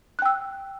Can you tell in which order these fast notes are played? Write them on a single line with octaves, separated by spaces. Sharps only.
F#6 G5 E6